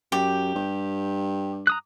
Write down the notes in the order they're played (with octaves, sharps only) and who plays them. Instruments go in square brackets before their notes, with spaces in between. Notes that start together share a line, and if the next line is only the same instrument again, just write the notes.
[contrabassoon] F#2 [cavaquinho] G4
[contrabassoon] G2
[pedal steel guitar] A#5 D#6 F#6